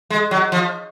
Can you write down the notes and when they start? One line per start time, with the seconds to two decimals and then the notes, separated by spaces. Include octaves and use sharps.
0.10 G#3
0.31 F#3
0.52 F3